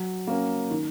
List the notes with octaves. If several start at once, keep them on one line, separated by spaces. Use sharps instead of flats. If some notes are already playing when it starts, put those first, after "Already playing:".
Already playing: F#3
A#3 C#4
D#3